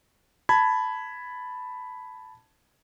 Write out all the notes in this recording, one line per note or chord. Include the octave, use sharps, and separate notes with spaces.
A5 B5 G#6